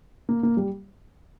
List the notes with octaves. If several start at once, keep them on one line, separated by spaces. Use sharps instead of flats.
A#3
A#3
G3